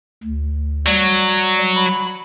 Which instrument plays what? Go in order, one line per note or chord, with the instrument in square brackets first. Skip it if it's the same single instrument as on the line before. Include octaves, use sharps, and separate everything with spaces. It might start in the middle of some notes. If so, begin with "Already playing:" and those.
[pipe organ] D2
[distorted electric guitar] F#3 [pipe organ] G3
[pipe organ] B5